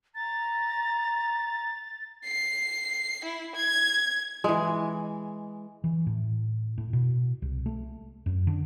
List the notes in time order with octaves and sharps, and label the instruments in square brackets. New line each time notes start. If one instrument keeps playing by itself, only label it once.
[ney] A#5 [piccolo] A6
[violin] C7
E4
G#6
[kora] E3 G#3
[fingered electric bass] E3
A2
A2
B2
C2
A3
F#2
D3